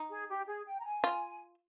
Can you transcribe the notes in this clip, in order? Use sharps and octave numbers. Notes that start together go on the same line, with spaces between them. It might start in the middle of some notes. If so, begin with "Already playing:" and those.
Already playing: D#4
G#4
G4
G#4
G5
A#5
G#5
F4